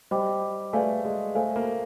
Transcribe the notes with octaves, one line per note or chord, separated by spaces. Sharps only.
G3 C5 D#5 G5 B5 D6
A3 G#4 B4 D5 F5 G#5
G#3
A3 A4 C5 F5 G#5
A#3